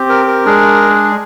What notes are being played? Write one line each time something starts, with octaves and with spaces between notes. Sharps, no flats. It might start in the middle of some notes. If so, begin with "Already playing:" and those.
Already playing: C4 G4
A#4
A#4
G#3 D4 G#4